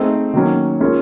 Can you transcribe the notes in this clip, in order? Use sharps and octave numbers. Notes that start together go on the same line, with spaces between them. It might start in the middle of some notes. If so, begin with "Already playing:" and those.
Already playing: A3 C4 D#4 G#4
D#3 F#3 A#3 C#4
G#3 C#4 F4 A#4